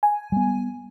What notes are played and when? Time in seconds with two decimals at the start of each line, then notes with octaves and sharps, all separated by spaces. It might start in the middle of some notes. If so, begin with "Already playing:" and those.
0.03 G#5
0.32 G3 B3